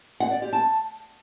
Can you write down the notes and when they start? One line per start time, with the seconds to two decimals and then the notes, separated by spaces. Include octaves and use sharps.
0.20 F#5
0.31 D5
0.42 G4
0.53 A5